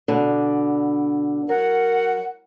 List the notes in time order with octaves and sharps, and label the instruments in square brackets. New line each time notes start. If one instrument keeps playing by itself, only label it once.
[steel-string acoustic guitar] B2 D3 D4
[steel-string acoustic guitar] F#3 [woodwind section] A#4 F#5